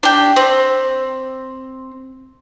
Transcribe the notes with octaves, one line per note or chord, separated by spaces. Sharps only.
D4 G4
C4